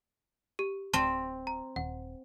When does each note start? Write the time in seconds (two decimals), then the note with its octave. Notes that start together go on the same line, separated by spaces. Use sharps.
0.59 G4
0.94 D1 C4 A5
1.47 A#5
1.76 D#1 F#5